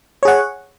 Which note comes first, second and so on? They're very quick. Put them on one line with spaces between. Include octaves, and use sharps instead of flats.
C#5 G#4 F#5